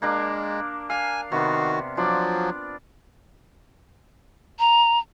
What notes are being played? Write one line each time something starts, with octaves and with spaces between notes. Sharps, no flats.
G#3 A#3 D4 A#4
F5 G#5
C3 D#3 B3 F#4
F3 F#3 D4 F4 D5
A#5